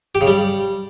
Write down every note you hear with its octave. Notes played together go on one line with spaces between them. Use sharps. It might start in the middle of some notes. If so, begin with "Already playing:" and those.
G4
C#3
G3